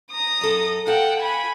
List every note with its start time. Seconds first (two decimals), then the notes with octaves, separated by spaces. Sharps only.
0.11 A#5 D#6
0.41 F#2 A4
0.87 F4 A4 F#5 G5
1.20 G#5 B5